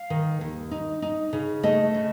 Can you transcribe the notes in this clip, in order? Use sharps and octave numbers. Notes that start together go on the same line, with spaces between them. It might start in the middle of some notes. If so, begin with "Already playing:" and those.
Already playing: F5
D#3
D#2
D#4
D#4
C#3
A3 D#5
C#3